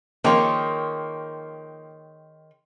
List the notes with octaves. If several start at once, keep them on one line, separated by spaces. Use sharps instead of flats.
D#3 F3 A#3 G#4 C#5 G5 C6